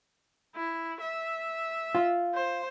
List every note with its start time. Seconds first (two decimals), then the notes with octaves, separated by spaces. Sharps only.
0.55 E4
1.00 E5
1.95 F4
2.34 C5